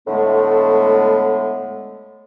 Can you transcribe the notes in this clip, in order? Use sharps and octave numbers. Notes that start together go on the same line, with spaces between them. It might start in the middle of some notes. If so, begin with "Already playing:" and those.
A2 D3 G#3 A3 B3